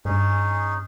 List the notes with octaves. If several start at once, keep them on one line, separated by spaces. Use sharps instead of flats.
G2 C#4 D#4 G#4